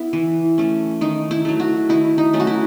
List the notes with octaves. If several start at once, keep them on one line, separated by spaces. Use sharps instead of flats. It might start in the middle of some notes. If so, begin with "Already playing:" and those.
Already playing: B3 E4
E3
A3 C#4
D#3 D#4
E4
F#3 A3
F#4
D#3 E4
D#4
F#3 A3 C#4
F#4
E4